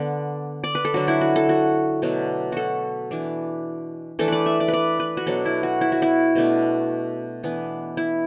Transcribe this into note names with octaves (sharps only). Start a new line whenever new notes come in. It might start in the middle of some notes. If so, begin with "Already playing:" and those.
Already playing: D3 B3 D4
D5
B4
A4
D3 F#3 D4 F#4
E4
F#4
A4
F#4
B2 F#3 A3 D4
F#4 A4
E3 D4
E3 A3 D4 A4
B4 D5
E5
D5
B4
D5
B4
F#4
B2 F#3 D4 A4
E4
F#4
E4
F#4
E4
B2 A3 D4
E3 B3 D4
E4